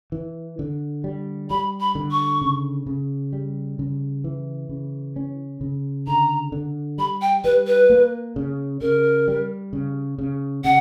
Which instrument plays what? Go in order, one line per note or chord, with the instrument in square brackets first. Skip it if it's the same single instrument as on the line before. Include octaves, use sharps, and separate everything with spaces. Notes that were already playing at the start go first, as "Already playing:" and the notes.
[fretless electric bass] E3
D3
G3
[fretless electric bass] G3 [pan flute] B5
[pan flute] B5
[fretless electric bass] D3
[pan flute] C#6
[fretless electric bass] C#3
C#3
G3
C#3
E3
C#3
C#4
C#3
[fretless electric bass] D3 [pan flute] A#5
[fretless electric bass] D3
[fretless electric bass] G3 [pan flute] B5
[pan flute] G5
[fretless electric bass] G3 [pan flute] B4
[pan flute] B4
[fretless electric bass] A#3
C#3
[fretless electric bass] C#3 [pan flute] A#4
[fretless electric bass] G3
C#3
C#3
[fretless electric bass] C#3 [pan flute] F#5